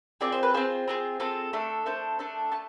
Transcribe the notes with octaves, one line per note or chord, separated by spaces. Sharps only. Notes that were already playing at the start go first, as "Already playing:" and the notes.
C4 F4 G#4 D5
C5
B4
C4 F4 G#4 C5
C4 F4 G#4
C4 F4 G#4 A4
A3 D4 A4
A3 D4 A4 C5
A3 D4 A4
A3 A5